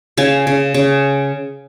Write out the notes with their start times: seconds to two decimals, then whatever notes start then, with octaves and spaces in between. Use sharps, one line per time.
0.17 C#3 F5 G#5
0.47 C#3
0.74 C#3